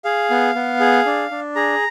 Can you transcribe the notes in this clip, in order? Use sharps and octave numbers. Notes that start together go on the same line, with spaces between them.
G#4 F5
B3
B3
G#4
D4
D4
G#4 A#5